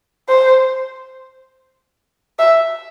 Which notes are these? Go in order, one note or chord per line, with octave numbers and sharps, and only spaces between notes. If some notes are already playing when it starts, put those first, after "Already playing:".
C5
E5